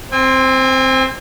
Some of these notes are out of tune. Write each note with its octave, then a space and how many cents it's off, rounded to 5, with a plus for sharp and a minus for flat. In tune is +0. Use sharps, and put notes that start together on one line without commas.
C4 +0 G#5 -45